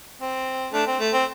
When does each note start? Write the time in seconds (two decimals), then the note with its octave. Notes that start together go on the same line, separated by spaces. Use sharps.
0.21 C4
0.73 A3 D4
0.87 C4
1.00 A3
1.13 C4